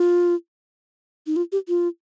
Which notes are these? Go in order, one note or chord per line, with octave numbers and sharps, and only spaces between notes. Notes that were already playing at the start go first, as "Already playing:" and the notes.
Already playing: F4
D#4
F4
G4
F4